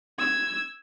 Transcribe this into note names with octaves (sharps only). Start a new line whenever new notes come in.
E6 G#6